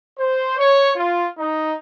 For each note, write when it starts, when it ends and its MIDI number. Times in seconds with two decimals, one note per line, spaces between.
0.18 0.55 72
0.58 0.91 73
0.96 1.25 65
1.39 1.74 63